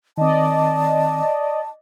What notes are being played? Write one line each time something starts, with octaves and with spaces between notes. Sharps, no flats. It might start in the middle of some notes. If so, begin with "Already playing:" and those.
D#3 C4 D5 D#5 A5